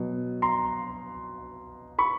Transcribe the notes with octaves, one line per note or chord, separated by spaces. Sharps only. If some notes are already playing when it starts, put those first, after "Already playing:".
Already playing: B2 F#3
A#5 C6
B5 C#6